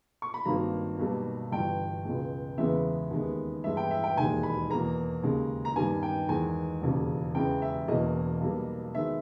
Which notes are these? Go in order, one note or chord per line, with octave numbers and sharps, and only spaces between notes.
C#6
B5
G#1 G2 D#3 A#3 A#5
B1 B2 G3 A#3
G1 G2 E3 G5
C#2 B2 G#3
E2 C#3 E3 G#3 B3 E5
D#2 D#3 G#3 B3
G2 E3 G#3 B3 E5
G5
E5
G5
E1 D#2 D#3 G#3 G#5
B5
E2 B2 A#3 A#5
D#2 C#3 G#3
A#5
G2 D#3 G3 B3 G#5
G5
E2 D#3 G#3 G#5
E1 D#2 C#3
E2 C#3 E3 G#3 G5
E5
E1 E2 B2 A#3 D#5
B1 B2 G3 A#3
D#3 G#3 B3 E5